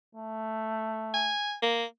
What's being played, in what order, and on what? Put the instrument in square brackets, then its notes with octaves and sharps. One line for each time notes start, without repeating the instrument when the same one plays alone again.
[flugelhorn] A3
[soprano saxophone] G#5
A#3